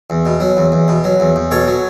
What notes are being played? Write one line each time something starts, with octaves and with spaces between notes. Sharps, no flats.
E2
B2
F#3
E2
E2
B2
F#3
E2
E2
B2 A4 C#5
F#3